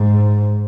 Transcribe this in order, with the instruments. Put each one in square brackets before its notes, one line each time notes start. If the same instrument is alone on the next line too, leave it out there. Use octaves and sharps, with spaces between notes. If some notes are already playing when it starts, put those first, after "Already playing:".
Already playing: [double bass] G#2